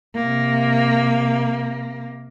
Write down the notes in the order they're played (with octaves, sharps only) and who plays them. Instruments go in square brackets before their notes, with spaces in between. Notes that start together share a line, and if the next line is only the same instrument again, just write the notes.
[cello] C3 A#3